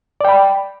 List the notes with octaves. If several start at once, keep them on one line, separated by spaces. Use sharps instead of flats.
D5 G5 B5